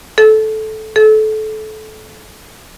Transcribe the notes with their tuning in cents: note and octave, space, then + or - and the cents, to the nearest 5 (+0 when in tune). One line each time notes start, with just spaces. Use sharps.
A4 -15
A4 -25